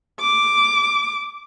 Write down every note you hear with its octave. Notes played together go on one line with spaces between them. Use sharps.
D6